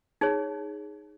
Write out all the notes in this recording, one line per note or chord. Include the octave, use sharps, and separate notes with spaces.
D#4 G#4 C#5